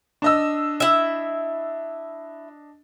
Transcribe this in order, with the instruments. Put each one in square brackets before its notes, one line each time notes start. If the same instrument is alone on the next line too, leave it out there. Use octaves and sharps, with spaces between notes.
[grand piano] D4 D#5 E6
[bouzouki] E4 E5